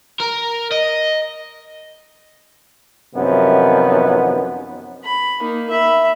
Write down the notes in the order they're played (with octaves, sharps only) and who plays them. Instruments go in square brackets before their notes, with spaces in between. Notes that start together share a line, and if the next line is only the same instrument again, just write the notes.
[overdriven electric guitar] A#4
D#5
[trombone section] F#2 C3 D#3 F3 B3
[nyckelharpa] B5
A#3 D#4
E5 B5